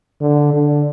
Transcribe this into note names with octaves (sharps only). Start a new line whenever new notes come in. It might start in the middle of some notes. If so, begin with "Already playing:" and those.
D3
D3